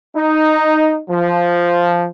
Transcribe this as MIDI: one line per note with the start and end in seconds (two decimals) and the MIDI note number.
0.16 1.00 63
1.09 2.08 53